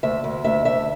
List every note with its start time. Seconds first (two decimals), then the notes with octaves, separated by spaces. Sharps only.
0.03 D2 E5
0.24 D2
0.44 D2 E5
0.65 D2 E5